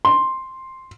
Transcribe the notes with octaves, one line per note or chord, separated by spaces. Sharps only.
C6